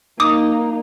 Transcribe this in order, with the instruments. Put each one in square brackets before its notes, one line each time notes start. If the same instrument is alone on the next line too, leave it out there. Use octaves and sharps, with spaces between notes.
[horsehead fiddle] A#3 D#4 [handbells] D6 D#6